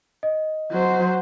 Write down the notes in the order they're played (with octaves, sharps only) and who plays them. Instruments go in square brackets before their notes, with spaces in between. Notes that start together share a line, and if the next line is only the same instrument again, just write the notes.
[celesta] D#5
[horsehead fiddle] F#3 C5